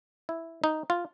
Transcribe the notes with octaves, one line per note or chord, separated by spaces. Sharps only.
E4
D#4
F4